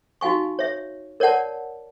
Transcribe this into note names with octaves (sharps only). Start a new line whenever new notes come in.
D#4 F#4 F5 G#5 C#6
C#5 E5
A#4 C#5 D5 F#5 A5